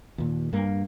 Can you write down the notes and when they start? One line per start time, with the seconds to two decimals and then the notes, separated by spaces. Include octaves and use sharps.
0.18 D#2 A#2
0.53 G2 A#3